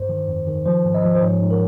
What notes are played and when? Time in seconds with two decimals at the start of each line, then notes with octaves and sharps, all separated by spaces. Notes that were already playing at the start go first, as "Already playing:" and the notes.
Already playing: G2 C5
0.09 D#3
0.28 F2
0.47 D#3
0.66 F3 C5
0.85 G#2
0.94 D#5
1.04 F3
1.15 C5
1.23 G#2 C#5
1.41 G#2
1.51 A#4